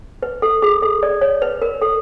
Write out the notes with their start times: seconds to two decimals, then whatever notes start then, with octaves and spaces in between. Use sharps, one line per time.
0.23 B4
0.42 A4
0.62 G#4
0.82 A4
1.03 D5
1.21 C#5
1.42 B4
1.62 A#4
1.82 A4